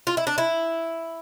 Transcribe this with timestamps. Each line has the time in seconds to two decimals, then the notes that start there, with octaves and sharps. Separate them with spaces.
0.07 F4
0.17 E4
0.27 D4
0.38 E4